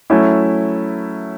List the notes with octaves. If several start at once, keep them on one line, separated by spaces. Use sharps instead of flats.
F#3 A3 C#4 E4